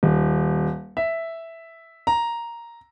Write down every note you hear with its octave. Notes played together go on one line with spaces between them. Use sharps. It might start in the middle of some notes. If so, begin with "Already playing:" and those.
D#1
E5
A#5